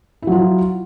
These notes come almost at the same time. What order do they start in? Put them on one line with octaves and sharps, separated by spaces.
E4 F#3 F4